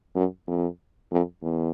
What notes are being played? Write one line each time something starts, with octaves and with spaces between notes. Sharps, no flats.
F#2
F2
F2
E2